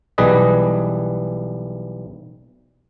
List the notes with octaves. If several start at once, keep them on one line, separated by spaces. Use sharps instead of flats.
B1 E3 G3 G#4 B4 D#5